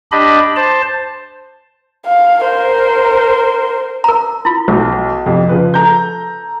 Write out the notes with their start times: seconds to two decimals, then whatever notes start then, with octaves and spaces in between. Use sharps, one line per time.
0.12 D4 G4 D#5 B5
0.56 C5 A5
2.06 F5
2.42 A#4 C5
4.04 A#4 A#5
4.45 E4 F4
4.68 B1
5.26 F2 C3
5.49 C#3 F3 B4
5.74 A4 A#5 G6